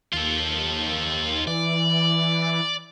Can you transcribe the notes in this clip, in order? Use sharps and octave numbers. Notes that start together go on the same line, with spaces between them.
D#2 F4 A4
E3 D5